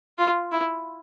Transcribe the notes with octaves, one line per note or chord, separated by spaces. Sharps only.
F4
E4